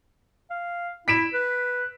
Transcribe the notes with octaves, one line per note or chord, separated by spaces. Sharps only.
F5
E4 B6 D7 E7
B4